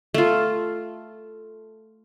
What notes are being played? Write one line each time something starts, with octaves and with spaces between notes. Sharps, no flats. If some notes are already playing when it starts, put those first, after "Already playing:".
A3 F4